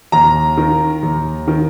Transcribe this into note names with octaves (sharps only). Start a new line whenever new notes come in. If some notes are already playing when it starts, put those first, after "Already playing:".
D#2 A#5
D#3
D#2
D#3